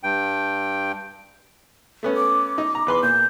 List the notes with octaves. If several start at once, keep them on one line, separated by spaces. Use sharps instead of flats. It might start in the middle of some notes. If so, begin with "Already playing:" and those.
G2 G5
A3 B3 C#4
D6
D#4
A#5
E2 B4 C6
A#2 G6